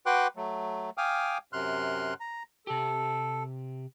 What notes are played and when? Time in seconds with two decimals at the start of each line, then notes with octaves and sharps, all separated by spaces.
0.06 F#4 B4 G5 C6 D6 F#6
0.36 F#3 A3
0.98 F5 G5 G#5 D6 D#6 F6
1.53 F#2 C3 C6 F6 F#6
2.20 A#5
2.67 C3 G4 A4